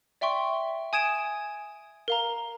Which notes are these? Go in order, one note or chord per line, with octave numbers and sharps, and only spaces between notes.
D5 E5 G5 C6 C#6
G#5 D#6 G#6 D7 E7
A#4 F5 A#5